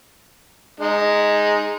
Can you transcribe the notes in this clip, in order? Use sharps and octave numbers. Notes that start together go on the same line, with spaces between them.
G#3 D#4